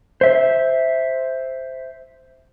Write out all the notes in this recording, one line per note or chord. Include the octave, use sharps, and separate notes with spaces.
C5 E5